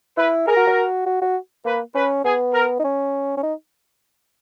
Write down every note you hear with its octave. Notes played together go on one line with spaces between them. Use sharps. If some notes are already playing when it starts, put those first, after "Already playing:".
E4 B4
G#4 A#4
F#4
F#4
F#4
F#4
A#3 B4
C#4 B4
B3 G#4
A#4
D#4
C#4
C#4
D#4